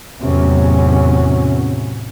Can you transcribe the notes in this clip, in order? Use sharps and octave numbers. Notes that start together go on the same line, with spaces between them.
E2 A2 C3 F#3 C#4